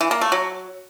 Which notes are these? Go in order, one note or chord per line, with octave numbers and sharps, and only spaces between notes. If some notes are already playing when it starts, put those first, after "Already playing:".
E3
A#3
A3
F#3